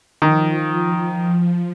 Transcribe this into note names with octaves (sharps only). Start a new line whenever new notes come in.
D#3 F3